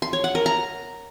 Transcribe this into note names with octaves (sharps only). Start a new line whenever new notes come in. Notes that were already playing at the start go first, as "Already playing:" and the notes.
C6
C#5
F#5
A#4
A#5